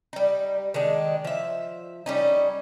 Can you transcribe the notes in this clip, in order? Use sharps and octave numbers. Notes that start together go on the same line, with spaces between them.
G3 D#4
D#3 G#3 D4
F3 E5
G3 C#4 D#4